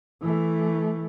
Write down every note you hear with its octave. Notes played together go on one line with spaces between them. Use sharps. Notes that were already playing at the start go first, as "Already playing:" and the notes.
E3 A3